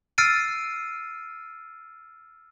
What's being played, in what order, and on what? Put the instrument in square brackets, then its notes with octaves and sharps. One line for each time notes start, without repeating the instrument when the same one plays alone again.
[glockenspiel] E6 F6 A6 C7 D7 D#7